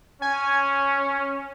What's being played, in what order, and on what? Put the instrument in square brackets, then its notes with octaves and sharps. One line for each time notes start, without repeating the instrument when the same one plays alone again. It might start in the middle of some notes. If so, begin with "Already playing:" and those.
[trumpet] C#4 [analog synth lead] G#5